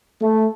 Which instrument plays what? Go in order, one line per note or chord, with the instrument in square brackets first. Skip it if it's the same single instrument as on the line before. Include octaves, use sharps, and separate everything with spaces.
[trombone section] A3